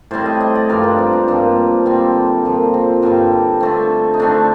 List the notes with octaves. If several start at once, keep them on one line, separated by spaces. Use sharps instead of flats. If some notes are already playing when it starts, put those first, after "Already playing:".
A2 G3 C4 C5
D#5
D#5
D5
G2 F3 C4 A#4
D4
C4
D4
G2 F3 A#3 C4
D3 G3 C4
A#2 F3 C4
C4
G2 D3 G3 C4
D3 A3 C4
D#4
D3 A3 C4 D4